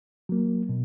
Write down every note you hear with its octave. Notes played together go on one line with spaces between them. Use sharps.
F#3 A#3
B2